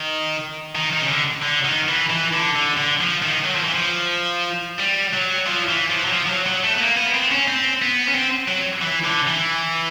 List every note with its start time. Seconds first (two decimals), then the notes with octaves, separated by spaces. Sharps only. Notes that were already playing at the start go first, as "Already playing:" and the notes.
Already playing: D#3
0.75 D#3
0.93 D#3
1.02 C#3
1.09 D3
1.43 D3
1.65 D#3
1.89 E3
2.10 E3
2.33 D3
2.55 D3
2.77 D3
3.01 F3
3.22 D#3
3.44 F#3
3.55 F3
3.64 E3
3.74 F3
4.79 G3
5.13 F#3
5.46 F3
5.69 E3
5.91 F3
6.06 F#3
6.13 F3
6.26 F3
6.30 F#3
6.47 F#3
6.64 A3
6.74 B3
6.81 A#3
6.97 B3
7.14 C4
7.31 C#4
7.48 C4
7.82 B3
8.08 C#4
8.15 C4
8.48 F#3
8.82 E3
9.05 D3
9.27 E3